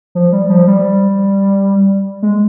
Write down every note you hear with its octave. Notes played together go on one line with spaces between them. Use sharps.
F3
G3
F3
G3
G#3